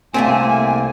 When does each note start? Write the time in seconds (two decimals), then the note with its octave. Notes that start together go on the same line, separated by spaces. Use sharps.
0.14 C2 A3 A#3 C4 G#5